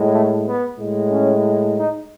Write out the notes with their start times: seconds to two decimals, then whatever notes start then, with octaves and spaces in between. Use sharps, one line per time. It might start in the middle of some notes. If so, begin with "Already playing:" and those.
Already playing: A2 G#3
0.12 A3
0.45 B3
0.78 A2 G#3
1.10 C#4
1.77 D#4